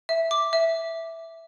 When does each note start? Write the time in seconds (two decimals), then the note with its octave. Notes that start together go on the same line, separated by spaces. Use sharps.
0.09 E5
0.31 D6
0.53 E5